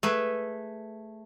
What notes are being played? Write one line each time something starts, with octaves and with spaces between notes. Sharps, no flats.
A3 G#4 B4